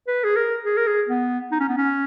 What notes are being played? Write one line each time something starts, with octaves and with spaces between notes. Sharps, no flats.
B4
G#4
A#4
G#4
A#4
G#4
B3
D#4
C#4
B3
C#4